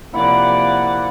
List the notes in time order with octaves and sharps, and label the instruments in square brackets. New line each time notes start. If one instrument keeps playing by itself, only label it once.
[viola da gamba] C3 F3 D5 [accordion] A#3 F#5 [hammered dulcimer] E4